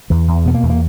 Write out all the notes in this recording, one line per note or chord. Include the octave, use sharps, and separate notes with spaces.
E2 E3
E2
B2 B3
A#3
E2
A#3